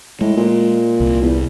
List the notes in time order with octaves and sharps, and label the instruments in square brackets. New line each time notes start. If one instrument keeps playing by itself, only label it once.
[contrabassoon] A2 [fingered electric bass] G#3
[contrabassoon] A#2
[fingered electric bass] C2
[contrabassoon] E2